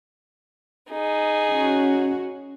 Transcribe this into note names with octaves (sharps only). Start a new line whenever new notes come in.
D#4 G#4
C#4 F#4